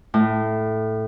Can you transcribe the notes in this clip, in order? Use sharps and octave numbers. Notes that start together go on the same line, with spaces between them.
A2